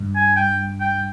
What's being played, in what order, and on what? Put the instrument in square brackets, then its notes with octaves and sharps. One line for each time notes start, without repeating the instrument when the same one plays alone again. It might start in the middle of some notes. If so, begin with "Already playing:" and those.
Already playing: [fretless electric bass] G2
[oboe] G#5
G5
G5